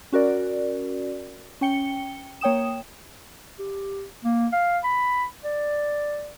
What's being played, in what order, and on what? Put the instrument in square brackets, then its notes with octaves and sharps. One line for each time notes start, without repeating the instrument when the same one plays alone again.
[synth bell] C#4 F#4 A#4 D5
C#4 G5 C#7 G7
A#3 C#5 G5 D#6 E7
[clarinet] G4
A#3
F5
B5
D5